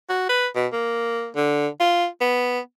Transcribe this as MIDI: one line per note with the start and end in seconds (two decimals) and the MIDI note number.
0.09 0.25 66
0.29 0.47 71
0.55 0.67 47
0.72 1.28 58
1.36 1.68 50
1.80 2.06 65
2.21 2.59 59